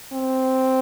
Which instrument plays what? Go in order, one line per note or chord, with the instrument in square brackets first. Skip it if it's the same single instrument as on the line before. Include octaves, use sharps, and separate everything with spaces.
[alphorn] C4